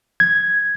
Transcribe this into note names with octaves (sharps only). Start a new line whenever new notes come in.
G#6